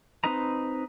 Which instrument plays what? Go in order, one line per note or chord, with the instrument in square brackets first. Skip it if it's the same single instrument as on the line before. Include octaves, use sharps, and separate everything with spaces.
[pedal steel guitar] C4 D#4 B4 D#5 A#5